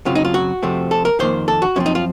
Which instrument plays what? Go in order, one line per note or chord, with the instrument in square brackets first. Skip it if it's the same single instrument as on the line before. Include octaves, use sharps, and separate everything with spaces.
[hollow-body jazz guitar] F#2 C#3 F#3 C4 F4
D#4
F4
F#4
F2 C3 F3 A3 C4
A4
A#4
F2 D#3 A#3 C5
A4
F#4
F#2 F3 C4 C#4
D#4
F4